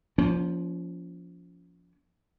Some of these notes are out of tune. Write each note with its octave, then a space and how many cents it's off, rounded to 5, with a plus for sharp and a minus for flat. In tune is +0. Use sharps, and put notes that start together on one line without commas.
F3 +0 A#3 +45 C#4 +40